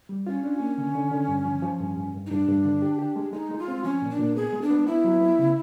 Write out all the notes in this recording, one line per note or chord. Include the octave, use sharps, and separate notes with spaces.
G3
C#4 F4
D4
A#3
D3
D3
D3
G2
F3
F3
G2
G2
G2
D#4
G2 D4
G2
D3
G4
G4
G#3
G#3 D#4
G#3
F4
C4
F3 C#4
A#2
D4
A#2
B3 G#4
G#3
D4
B3
B3 E4
F#3
B3
C#3